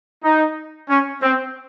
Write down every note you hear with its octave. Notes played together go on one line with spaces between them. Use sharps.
D#4
C#4
C4